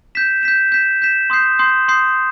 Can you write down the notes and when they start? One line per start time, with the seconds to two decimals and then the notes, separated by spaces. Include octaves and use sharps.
0.15 G6 B6 E7
0.43 G6 B6 E7
0.72 G6 B6 E7
1.02 G6 B6 E7
1.30 C6 D#6 G6 C7
1.59 C6 D#6 G6 C7
1.88 C6 D#6 G6 C7